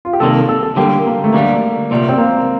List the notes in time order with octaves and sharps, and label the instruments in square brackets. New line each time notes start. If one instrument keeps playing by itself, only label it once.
[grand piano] F4
G4
[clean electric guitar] C2 C3 D#3 A#3 [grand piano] A4
[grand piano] A4
A4
[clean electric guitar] D3 G3 A#3 [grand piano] G4
[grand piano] A#3
A3
[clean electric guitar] D2 D3 G3 [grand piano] A#3
[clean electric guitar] C2 A#2 G3
[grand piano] C4
A#3